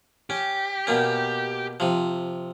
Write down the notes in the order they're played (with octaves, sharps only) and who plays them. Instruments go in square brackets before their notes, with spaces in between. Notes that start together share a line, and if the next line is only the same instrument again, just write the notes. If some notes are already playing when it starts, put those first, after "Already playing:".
[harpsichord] C#4 [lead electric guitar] G4
[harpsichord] B2 A#3 C#4
C3 F3